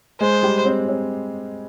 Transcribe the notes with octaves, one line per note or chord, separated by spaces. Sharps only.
G#3 G#4 C5
G3 G4
C4
C4